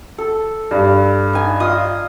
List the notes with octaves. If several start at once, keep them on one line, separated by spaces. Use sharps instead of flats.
A4
G2
D#4 G#5
F4 D#5 D#6